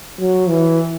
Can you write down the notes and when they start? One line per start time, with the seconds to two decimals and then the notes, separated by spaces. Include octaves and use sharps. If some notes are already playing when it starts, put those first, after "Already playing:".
0.20 F#3
0.49 E3